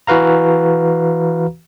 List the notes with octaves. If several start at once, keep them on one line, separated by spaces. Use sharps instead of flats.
E3 F#4 B4 F5 A#5